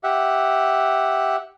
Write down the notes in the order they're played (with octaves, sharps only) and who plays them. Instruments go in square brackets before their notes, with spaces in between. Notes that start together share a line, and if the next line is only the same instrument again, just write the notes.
[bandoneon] G4 E5 F#5